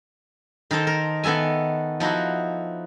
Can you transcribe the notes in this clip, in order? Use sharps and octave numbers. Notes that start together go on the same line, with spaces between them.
D#3 D#4 A4 C5
A#4
D#3 B3 A4 E5 G#5
F3 D#4 E4 F#4